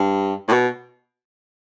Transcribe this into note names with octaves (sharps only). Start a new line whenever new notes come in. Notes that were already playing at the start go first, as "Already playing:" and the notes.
Already playing: G2
A2
B2